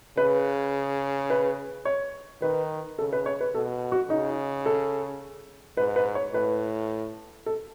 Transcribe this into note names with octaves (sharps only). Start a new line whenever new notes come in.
C#3 B4
B4
C#5
D#3 B4
C#3 A4
B4
C#5
B4
B2 A4
F#4
C#3 D#4
A4
G#2 B4
B4
C#5
A2 B4
A4